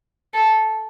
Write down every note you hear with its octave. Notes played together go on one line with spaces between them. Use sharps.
A4